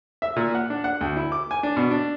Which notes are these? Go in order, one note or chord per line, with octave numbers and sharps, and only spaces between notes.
E5
A#2
F#5
D4
F#5
D2
E4
D6
G#5
D4
B2
D4